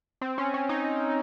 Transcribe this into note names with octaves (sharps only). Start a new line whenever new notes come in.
C4
C#4
C#4
D#4